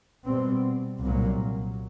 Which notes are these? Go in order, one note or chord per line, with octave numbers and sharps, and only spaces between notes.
B2 G3 C4
C2 A#2 F#3 A#3